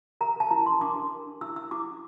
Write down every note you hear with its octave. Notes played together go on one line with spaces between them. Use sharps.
A#4 A#5
A#4 A5
E4 A#5
A#4 C6
D4 D6
A#4
A#4
D4
E4 E6
E4 E6
E4 D6
E4